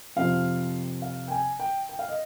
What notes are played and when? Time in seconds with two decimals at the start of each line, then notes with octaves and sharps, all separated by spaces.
0.16 F2 C3 F3 C4 F5
1.02 F5
1.28 G5
1.31 G#5
1.60 G5
1.89 G5
1.99 F5
2.09 D#5